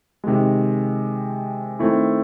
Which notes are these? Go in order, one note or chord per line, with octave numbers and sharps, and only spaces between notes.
C3 D#3 G#3
D#3 A3 C4 E4